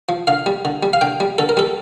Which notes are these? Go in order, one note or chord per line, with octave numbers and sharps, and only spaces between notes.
F3
D3 F5
G3
D3
G3
F5
D3 G5
G3
D3 A4
A#4
G3 A4